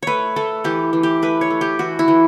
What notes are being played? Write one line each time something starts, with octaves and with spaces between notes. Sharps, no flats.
A3 B4 C#5
A3 A4
E3 G4
E3
G4
A3 B4
C#5
A3
G4
E3 F#4
E4
E3